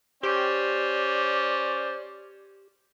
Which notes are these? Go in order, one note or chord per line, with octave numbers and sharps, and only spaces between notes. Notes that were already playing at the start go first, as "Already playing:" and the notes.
C#4 G4 C5 D5